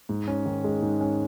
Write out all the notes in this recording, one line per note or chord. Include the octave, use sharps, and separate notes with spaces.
G#2
C#4
D#3
G#3
G#2
C#4